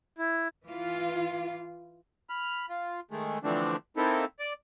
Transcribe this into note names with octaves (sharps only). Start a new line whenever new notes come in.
E4
E3 F4
B5 F6
F4
D#3 G#3 A3
D3 E3 F3 A3 C4 D4
A#3 C4 D#4 E4 A4
D5